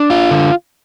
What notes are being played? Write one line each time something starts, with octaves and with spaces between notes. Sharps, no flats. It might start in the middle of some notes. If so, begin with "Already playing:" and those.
Already playing: D4
F4
D3